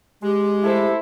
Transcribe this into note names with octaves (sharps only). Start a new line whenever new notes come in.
G#3 G4
A3 E4 A4 C5